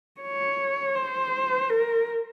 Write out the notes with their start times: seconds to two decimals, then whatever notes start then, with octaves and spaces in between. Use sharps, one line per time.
0.21 C#5
0.96 C5
1.70 A#4